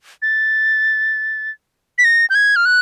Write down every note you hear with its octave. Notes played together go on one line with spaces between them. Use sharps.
A6
B6
A#6
G6
G#6
F6
F#6